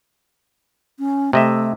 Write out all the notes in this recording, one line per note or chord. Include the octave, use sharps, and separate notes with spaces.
C#4
C3 A3 D#5 E5